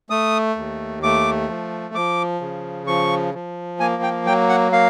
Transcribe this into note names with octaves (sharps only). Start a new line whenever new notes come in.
A3 D#6
D#2
A3 D6
F3
F3 D6
C#3
F3 C#6
F3
A#3 G#5
G5
F#3 G5
F#5
A#3 F5